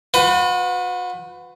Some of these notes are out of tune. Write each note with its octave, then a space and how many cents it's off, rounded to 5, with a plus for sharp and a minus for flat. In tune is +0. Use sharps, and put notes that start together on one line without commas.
F#4 -40 B4 +20 F#5 +40